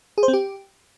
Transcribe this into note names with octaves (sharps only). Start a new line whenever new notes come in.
G#4
C5
C4
G4